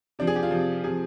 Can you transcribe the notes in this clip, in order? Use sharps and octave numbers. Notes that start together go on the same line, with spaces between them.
C3 F3 D4
G#4
G4
F4
C3 F3
C3 F3 G#4